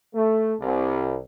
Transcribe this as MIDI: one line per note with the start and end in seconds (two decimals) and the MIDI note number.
0.14 0.54 57
0.60 1.18 36